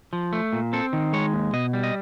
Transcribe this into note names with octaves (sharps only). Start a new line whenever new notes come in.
F3
A3
A#2
C4 A4
D#3
G#3 C#5
D#2
B2 D#5
G3
D#5